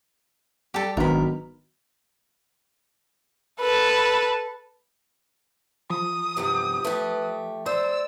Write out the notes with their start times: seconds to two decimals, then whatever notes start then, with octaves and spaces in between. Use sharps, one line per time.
0.74 G3 G4 A4
0.97 G#1 G#2 D#3 F#3 B3 D4 A#4 B5
3.61 A4 B4
5.90 F3 D#6
6.37 E2 G2 C3 G4
6.85 A3 G4 B4
7.66 C5 D5 E6